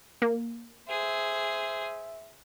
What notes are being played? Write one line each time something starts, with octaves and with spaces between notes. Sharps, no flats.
A#3
G#4 C5 E5